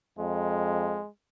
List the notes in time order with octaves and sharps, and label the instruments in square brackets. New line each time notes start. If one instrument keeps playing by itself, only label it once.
[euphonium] F2 [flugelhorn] G#3